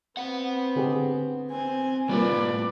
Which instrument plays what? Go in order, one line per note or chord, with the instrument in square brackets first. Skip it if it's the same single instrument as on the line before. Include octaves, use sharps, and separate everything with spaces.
[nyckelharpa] C4 [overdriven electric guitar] B4 F#5
[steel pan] D3 G4 G#4
[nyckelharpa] C4 [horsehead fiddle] G#5
[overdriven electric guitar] A2 F4 [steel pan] G3 A#3 [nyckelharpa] B4 [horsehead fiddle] D5